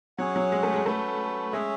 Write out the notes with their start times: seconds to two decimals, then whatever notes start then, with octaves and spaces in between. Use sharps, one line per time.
0.18 F#3 C#4 G#4 C#5 F#5
0.36 F#3
0.52 G#3
0.63 A3
0.74 G#3
0.86 A3 C#4 F#4 B4
1.53 G#3 C#4 G#4 C#5 E5